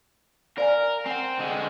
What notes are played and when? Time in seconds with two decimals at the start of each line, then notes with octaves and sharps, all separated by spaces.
0.58 A#4 D5 F5 G#5
1.06 C4 F#5 G#5
1.40 D3 G#3